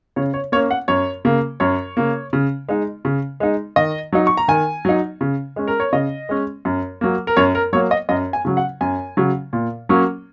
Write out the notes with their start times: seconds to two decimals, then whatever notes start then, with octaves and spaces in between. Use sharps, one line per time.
0.16 C#3 C#5
0.34 C#5
0.52 A#3 C#5
0.56 C#4
0.71 F#5
0.88 F#2 C#5
1.25 C#3 A#3
1.60 F#2 C#5
1.97 C#3 A#3
2.33 C#3
2.69 G#3 D#4
3.05 C#3
3.40 G#3 D#4
3.76 D#3 D#5
4.13 F#3 D#4
4.27 C#6
4.37 A#5
4.48 D#3 G#5
4.85 F#3 D#4
5.21 C#3
5.56 G#3 C#4
5.68 A#4
5.80 C#5
5.92 C#3 D#5
6.29 G#3 C#4
6.65 F#2
7.01 F#3 A#3
7.27 A#4
7.37 F#2 C#5
7.55 A#4
7.73 F#3 A#3 C#5
7.91 D#5
8.09 F#2 D#5
8.33 G#5
8.45 C#3 F#3
8.57 F#5
8.81 F#2 G#5
9.17 C#3 F#3
9.53 A#2
9.89 F#3 A#3 C#4